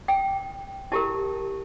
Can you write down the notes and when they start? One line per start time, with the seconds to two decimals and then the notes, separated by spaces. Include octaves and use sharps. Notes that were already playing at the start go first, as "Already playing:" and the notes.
0.08 G5
0.92 E4 G4 A#4 A5